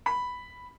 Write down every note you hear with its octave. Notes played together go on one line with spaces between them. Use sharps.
B5